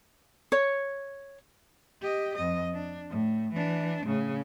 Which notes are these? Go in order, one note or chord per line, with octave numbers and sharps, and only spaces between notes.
C#5
G4 D#5
F2 D#5
D4
A2
E3 D4
A2 C#3